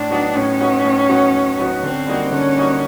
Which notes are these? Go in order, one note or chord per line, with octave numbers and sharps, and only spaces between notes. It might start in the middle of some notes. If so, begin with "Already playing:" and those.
Already playing: A2 D4
F#3 B3 D#4 F#4
A2 C#4
F#3 B3 D#4 F#4
A2
F#3 B3 D#4 F#4
A2
F#3 B3 D#4 F#4
D3 C4
G3 A#3 D#4 F#4
D3 C#4
G3 A#3 D#4 F#4